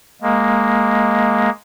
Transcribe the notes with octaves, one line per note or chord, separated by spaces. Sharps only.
G#3 A#3